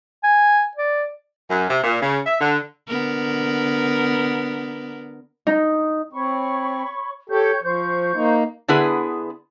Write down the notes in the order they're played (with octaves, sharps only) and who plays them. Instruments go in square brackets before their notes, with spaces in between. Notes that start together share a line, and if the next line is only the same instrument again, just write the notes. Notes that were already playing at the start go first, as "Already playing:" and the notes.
[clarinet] G#5
D5
[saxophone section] F#2
C3
A#2
C#3
E5
D3
[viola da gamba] D3 B3 A#4
[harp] D#4
[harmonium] C4 [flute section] C#5 B5 C#6
[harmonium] G4 A4 [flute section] C#5 C#6 G6
[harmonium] F3 [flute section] C5 C#6 G6
[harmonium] A#3 D#4
[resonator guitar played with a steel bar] D3 B3 E4 G#4 B4